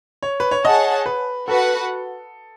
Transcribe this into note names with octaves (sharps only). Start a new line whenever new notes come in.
C#5
B4
C#5
G#4 C#5 D#5 F#5 A5
B4
F#4 A4 B4 F#5